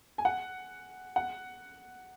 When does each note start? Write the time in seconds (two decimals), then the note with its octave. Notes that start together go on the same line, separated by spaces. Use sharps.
0.18 G#5
0.25 F#5
1.16 F#5